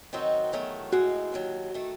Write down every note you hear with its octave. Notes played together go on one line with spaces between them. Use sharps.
D#3 F#3 C4 D#4 F#4
E2 D#3 F#3 A3
A2 G#3 D#4 F#4
D#2 D#3 F#3
D#3 A3